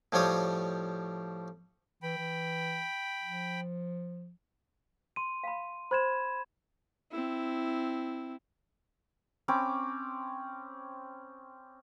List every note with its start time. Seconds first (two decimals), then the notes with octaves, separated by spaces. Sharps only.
0.12 A2 F3 G3 C#5 D#6
2.02 E3 G5 B5
2.18 E3
3.23 F3
5.16 C6 D#7
5.44 F5 B5
5.91 C5 B5 C6 G#6 E7
7.12 C4 E4
9.48 C4 C#4 B5 D6